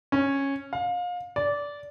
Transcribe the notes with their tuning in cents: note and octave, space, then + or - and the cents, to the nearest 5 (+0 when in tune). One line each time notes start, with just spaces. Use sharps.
C#4 -10
F5 +30
D5 -15